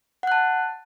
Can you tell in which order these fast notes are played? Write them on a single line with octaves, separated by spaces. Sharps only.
F#5 F#6 A5